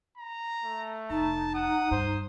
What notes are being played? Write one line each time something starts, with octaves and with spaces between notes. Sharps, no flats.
A#5
A3
F1 D#4 A5
F#5 D#6
G2 C5